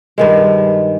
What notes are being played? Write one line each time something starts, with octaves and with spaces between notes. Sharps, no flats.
G2 D#3 G#3